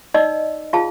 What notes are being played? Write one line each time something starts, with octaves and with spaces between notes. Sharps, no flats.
D#4 D5 D#5 E6
F4 G#4 F5 A5